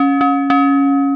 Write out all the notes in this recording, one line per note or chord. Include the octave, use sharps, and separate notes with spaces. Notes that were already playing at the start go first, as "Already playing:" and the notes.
Already playing: C#4
C#4
C#4